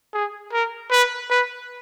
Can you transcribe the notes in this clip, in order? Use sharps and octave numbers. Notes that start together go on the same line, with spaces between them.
G#4
A#4
B4
B4